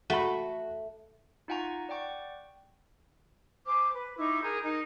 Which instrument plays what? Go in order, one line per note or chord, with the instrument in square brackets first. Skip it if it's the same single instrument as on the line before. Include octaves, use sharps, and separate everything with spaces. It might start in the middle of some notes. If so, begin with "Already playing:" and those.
[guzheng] A3 [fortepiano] F#4 B5
[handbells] D#4 F4 F#5 G#5 A#5 C#6
D5 F#5 G5 C#6
[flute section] C5 G#5 D6 F6
B4
D#4 E4 C#6 D6
G#4 A#4 A#5 G6
D#4 A#4